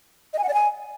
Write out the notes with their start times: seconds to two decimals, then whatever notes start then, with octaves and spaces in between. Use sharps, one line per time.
0.33 D#5
0.38 G#5
0.43 F#5
0.48 D5
0.54 G#5